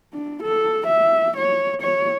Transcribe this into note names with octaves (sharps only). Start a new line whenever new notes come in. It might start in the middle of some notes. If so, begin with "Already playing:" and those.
D4
A4
E5
C#5
C#5